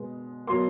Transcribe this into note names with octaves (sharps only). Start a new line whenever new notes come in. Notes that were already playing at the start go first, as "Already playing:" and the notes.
Already playing: B2 G#3 B3
B2 F#3 A#3 C6